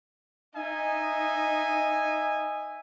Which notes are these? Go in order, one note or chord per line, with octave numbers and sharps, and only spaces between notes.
D#4 D#5 E5 G#5